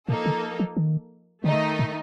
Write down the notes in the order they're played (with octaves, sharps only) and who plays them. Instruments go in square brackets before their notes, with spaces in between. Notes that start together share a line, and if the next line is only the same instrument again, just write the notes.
[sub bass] A#2 [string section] F3 A#3 D#4 A4
[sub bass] D3
F3
D#3
[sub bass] D3 [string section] D#3 A3 D#4
[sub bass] A#2